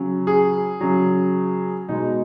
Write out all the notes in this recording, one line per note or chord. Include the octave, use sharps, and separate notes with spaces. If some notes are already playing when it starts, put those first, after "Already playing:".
Already playing: C#3 F#3
G#4
C#3 F#3
B2 G#3 D#4